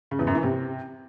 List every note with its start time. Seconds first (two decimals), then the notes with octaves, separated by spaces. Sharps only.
0.11 C#3
0.19 E2
0.27 F#2
0.35 E3
0.43 C3